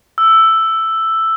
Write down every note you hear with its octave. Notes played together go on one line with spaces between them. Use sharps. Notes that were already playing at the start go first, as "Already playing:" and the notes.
E6